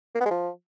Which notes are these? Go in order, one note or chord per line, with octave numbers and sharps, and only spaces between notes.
A#3
B3
G#3
F3